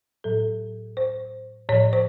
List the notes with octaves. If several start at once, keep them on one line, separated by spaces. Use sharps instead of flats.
A2 F#3 A4
C5
A2 F3 C#5
C5